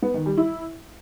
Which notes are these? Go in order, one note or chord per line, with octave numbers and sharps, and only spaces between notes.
B3
D#3
G3
E4